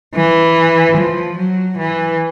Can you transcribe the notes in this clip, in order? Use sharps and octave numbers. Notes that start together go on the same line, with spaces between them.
E3
F3
F#3
E3